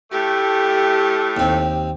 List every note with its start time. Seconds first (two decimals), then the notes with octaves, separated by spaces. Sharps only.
0.11 A2 A3 G4
1.37 D#2 C4